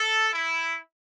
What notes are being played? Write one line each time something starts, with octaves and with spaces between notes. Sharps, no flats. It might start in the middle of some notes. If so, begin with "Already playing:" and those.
Already playing: A4
E4